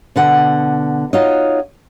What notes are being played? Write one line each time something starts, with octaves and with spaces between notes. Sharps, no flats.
B2 D3 F#5
D#4 F4 F#4 C#5 D#5